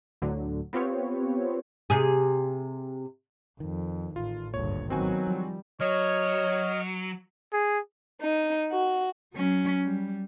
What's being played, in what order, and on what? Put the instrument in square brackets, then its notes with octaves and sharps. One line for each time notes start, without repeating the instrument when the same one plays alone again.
[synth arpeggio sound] D2 A2 D3 F#3
B3 C4 F4 G4 B4 C#5
[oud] C3 G#4
[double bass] F2 [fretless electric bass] D#3
[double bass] A1 [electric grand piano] F4
[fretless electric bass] G#1 A#2 [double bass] D2 G2 [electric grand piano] C#5
[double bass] D#3 B3 [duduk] F#3 [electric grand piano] C4 F#4 G#5
[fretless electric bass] F3 [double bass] G3
[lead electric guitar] F#3 [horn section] C#5 [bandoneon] D#5 F6
[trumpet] G#4
[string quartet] D#4
F#4
[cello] F#3 C#4
G3